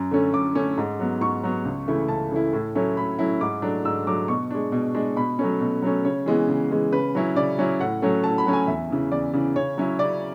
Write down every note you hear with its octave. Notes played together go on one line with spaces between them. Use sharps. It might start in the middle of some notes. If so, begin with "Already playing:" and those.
Already playing: F#2
D3 A3 C#4
F#2 D6
D3 A3 C#4
G#2
F#3 B3
G#2 C#6
F#3 B3
C#2
C#3 E3 A3 E4
C#2 A5
C#3 E3 A3 E4
A2
F#3 A3 C#4 E4
A2 B5
F#3 A3 C#4 E4
G#2 D6
F#3 A3 D4
G#2 E6
F#3 A3 D4 D6
B2 C#6
G#3 D4
B2
G#3 D4
B2 B5
F#3 A3 C#4
B2
F#3 A3 C#4
C#3 C#5
E3 G#3 B3
C#3
E3 G#3 B3
C#3 B4
F#3 C#4 E4
C#3 D5
F#3 C#4 E4
A2 F#5
F#3 A3 C#4
A2 A5
B5
F#3 A3 C#4
G#5
E2 E5
C#3 E3
E2 D5
C#3 E3
C#3 C#5
F#3 C#4 E4
C#3 D5